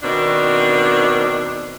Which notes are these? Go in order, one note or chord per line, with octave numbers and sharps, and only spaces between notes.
B2 D#3 C4 D4